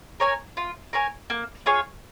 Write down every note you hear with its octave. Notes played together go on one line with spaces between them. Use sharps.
A#4 C#5 G#5
F4
A#4 C#5 G#5
A#3
F4 G#4 C#5